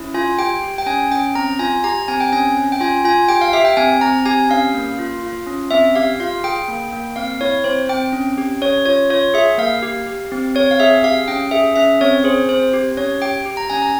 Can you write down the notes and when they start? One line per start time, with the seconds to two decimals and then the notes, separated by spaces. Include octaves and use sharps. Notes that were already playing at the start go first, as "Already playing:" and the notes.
Already playing: C#4 E4
0.14 F4 G#5
0.39 G4 G5
0.62 G4
0.78 G5
0.86 C#4 G#5
1.11 C#4 G5
1.35 C4 A#5
1.59 F4 G#5
1.84 G4 A#5
2.08 C4 G#5
2.20 G5
2.32 C#4 G#5
2.57 C#4
2.72 G5
2.81 F4 G#5
3.05 F4 G#5
3.29 G4 G5
3.41 F5
3.53 G4 E5
3.65 G5
3.77 C4 G#5
4.01 C4 A#5
4.26 G4 G#5
4.50 C#4 F5
4.74 A#3
4.99 F4
5.23 F4
5.46 C#4
5.71 C4 E5
5.95 G4 F5
6.20 F4 F5
6.44 G#4 G5
6.68 A#3
6.93 A#3
7.16 C4 F5
7.41 E4 C#5
7.64 C4 C5
7.89 C4 G5
8.13 C#4
8.38 G4
8.62 C#4 C#5
8.86 F4 C#5
9.10 F4 C#5
9.34 G#4 E5
9.58 A#3 F5
9.82 G4
10.07 G4
10.32 C4
10.55 C4 C#5
10.71 F5
10.80 G#4 E5
11.03 G4 F5
11.28 C#4 G5
11.51 G#4 E5
11.76 C#4 E5
12.01 C4 C#5
12.24 G#4 C5
12.49 C4 C5
12.74 G4
12.97 C#4 C#5
13.22 G4 G5
13.46 G4
13.57 A#5
13.70 C#4 G#5
13.82 A#5